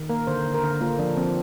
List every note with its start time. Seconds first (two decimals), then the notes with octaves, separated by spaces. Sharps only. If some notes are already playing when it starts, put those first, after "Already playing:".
Already playing: D#3
0.09 A#3 A#4
0.27 D3 C5
0.46 D3
0.54 A#4
0.63 D3
0.81 A#3 F4
0.99 F3 D4
1.17 F3 C4